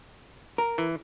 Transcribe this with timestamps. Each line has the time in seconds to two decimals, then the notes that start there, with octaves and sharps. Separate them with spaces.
0.58 A#4
0.78 E3